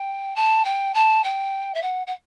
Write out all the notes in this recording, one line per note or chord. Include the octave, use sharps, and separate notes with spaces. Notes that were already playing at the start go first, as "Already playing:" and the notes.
Already playing: G5
A5
G5
A5
G5
E5
F#5
F#5